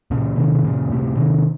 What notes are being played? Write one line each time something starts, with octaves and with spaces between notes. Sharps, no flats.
A#2 C#3
C3 D#3
C3
A#2 C#3
A2 C3
C3 D#3